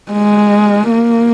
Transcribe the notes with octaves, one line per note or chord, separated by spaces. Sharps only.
G#3
A#3